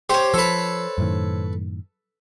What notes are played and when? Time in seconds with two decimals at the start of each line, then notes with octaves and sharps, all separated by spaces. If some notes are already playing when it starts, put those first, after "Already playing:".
0.10 G4 C5 C#5
0.34 F3 A4 B4
0.98 F#2 A2 D#3